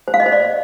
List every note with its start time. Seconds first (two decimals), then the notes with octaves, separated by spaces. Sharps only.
0.08 C5
0.14 F5
0.20 D#5
0.26 C5
0.32 D5